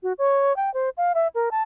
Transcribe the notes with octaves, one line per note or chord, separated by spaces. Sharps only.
F#4
C#5
G5
C5
F5
E5
A#4
A5